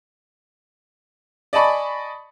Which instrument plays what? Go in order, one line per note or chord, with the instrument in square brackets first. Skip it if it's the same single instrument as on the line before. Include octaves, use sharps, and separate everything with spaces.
[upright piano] D5 D#5 G#5 A5 B5 C#6